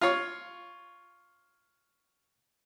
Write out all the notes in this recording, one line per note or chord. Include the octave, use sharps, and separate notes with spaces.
F4 C#5